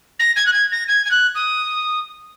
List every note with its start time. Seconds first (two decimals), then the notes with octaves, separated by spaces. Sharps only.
0.19 A#6
0.36 G#6
0.46 F#6
0.53 G#6
0.71 A#6
0.88 G#6
1.05 G#6
1.10 F#6
1.35 D#6